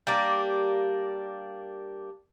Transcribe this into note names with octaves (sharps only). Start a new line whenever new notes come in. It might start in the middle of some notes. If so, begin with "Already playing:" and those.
G3 A#3 D4